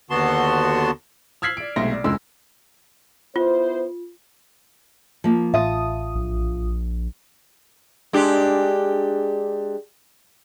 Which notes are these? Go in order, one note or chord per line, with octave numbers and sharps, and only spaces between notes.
D#2 D3 B3 F#4 A5 C6
E6 F6 G#6 B6 C7 F#7
D5 D7
B1 C3 G#3 A3 C6 A#6
D5
F1 C#2 G#3 C6 E6
B3 E4 F4 C5
F3 A#3
A1 F4 E5 A5 D#6
A#1
G#3 D4 G4